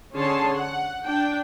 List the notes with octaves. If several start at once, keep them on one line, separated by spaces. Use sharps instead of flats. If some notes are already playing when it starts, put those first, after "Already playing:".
D3 C#4 G#4 C#5 A5 C6
F#5
D4 G5